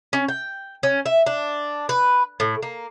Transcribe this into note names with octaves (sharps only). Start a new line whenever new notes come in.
C#4
G5
C#4
E5
D4
B4
A2
A#3